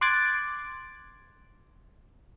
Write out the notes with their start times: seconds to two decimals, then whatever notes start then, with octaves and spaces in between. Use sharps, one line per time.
0.01 C6 D6 F#6 G#6 A6 D7